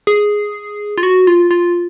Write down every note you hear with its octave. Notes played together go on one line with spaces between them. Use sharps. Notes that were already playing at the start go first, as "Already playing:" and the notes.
G#4
F4
F#4
F4
F4